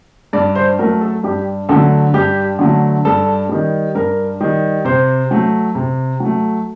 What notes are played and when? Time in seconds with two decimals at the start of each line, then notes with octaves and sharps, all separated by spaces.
0.33 G2 D5
0.55 C5
0.79 F#3 A3 A#4
1.01 A4
1.23 G2 G4
1.69 D3 F#3 A3 A4
2.14 G2 G4
2.59 D3 F#3 A3
3.05 G2 A4
3.49 D#3 G3
3.95 G2 A#4
4.40 D#3 G3
4.85 C3 C5
5.31 F#3 A3
5.75 C3
6.20 F#3 A3